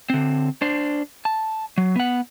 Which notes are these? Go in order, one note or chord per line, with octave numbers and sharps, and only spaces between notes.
D3 C4
D4 C5
A5
F#3
B3 F#5